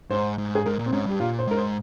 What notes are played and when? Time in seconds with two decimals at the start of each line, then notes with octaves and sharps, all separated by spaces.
0.10 G#2 C5
0.38 G#2
0.55 G#4
0.66 G#2 A#4
0.79 A#2
0.86 C4
0.92 G#2 C#4
1.06 G2 G4
1.20 A#2 F4
1.39 C5
1.48 G#2 A#4
1.57 C5